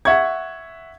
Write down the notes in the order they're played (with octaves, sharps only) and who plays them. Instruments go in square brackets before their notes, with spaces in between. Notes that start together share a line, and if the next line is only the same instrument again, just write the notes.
[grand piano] E5 F#5 C#6 G#6